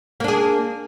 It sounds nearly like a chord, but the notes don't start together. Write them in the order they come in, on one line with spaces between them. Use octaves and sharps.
A#3 D4 G#4